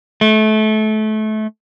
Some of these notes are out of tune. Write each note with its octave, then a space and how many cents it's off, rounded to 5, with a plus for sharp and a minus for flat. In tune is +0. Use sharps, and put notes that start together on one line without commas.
A3 -25